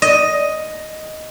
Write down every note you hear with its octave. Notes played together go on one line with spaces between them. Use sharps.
D#5